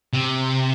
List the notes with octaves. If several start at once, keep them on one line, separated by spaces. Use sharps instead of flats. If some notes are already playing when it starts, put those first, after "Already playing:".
C3